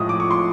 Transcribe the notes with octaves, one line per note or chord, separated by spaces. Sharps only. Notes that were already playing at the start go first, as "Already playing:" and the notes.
Already playing: A2 F3 G#3 D#6
D6
C#6
C6